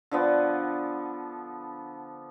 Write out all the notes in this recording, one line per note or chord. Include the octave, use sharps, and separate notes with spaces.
D3 F3 B3